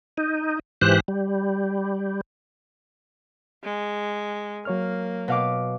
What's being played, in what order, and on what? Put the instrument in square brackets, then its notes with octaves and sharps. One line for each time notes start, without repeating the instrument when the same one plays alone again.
[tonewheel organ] D#4
G#2 E3 G4 C5 F#6
G3
[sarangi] G#3
[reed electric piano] F#3 C#5 F6 [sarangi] A#3
[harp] B2 F5 D6